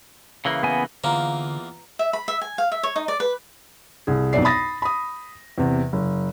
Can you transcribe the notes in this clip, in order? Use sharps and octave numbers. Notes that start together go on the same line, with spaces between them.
C#3 E3 A#3
B3 G#5
E2 D3 A#3 F4 B4 A#5
E5
B5
E5
G#5
F5
E5
C#5
D#4
D5
B4
C2 G#4
B1 F2 B2 D5 C7
B5 D#6 A6 A#6
B5 D#6
E2 C3
F#1